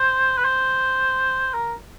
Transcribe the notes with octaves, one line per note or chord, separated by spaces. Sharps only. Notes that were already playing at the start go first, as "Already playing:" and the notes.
Already playing: C5
B4
C5
A#4